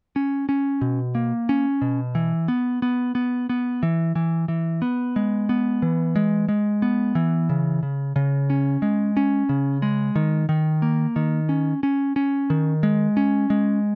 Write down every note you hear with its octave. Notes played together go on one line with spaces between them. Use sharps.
C#4
C#4
B2
A#3
C#4
B2
E3
B3
B3
B3
B3
E3
E3
E3
B3
G#3
B3
E3
G#3
G#3
B3
E3
C#3
C#3
C#3
C#4
G#3
C#4
C#3
G#3
D#3
D#3
A#3
D#3
C#4
C#4
C#4
D#3
G#3
C#4
G#3